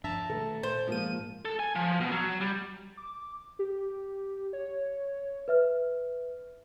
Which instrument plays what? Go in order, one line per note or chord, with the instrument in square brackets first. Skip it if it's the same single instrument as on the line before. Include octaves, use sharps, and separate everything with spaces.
[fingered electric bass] G2 F3 D4 [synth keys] E5 A5 A#5
[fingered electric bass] B2 D#3 A3 [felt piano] A4
[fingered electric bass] A#2 [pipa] C5
[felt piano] G#2 A#3 [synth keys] F3 D#7
[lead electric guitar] A4
G#5
F3
B2
F#3
G3
[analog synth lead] D6
G4
C#5
[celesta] B4 E5 F6